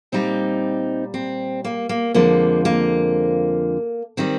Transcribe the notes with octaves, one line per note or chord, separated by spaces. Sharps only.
A#2 G3 C4 D#4
C4
A#3
A#3
F2 D3 F3 G#3 A#3
A#3
D#3 G3 C4